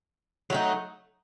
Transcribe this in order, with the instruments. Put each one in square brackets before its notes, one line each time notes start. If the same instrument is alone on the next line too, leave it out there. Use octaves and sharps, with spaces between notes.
[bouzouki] F#3 A3 D#4